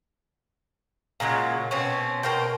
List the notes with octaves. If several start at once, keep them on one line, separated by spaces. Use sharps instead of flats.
A#2 C#3 F#3 G#3
B2 C4 C#4
B2 A#4 C5 G5